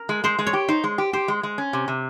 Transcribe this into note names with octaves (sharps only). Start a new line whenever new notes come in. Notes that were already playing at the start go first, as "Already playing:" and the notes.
Already playing: A#4
G#3
G#3 C5
G#3
C#5
G4
D#4 C5
G#3
G4
G4 C5
G#3
G#3
C#4
C3
C3